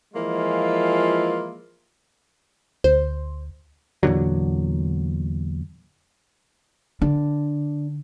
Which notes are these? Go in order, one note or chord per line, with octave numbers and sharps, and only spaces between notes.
E3 F3 G#3 A#3 E4 F4
D2 C5
E2 A#2 D3 F#3
D3 D4